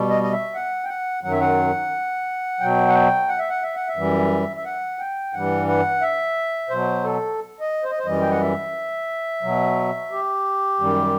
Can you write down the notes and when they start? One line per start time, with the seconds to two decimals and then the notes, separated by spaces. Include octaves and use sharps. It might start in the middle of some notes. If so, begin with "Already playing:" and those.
Already playing: B2 G3
0.10 D#5
0.23 D#5
0.33 E5
0.55 F#5
0.84 G5
0.89 F#5
1.23 F#2 D#3 F#3 F#5
1.32 E5
1.41 F#5
2.60 B2 F#3 G5
2.88 F#5
2.94 G5
3.29 F#5
3.39 E5
3.49 F#5
3.62 E5
3.75 F#5
3.88 E5
3.96 F#2 E3 G3
4.56 E5
4.65 F#5
4.99 G5
5.33 G2 E3 G3 F#5
5.68 F#5
6.02 E5
6.70 B2 F#3 C5
7.04 A4
7.60 D#5
7.84 C5
7.92 D#5
7.98 C5
8.06 F#2 E3 G3 D#5
8.21 G5
8.31 F#5
8.41 E5
9.43 B2 F#3
10.11 G4
10.80 F#2 D#3 G3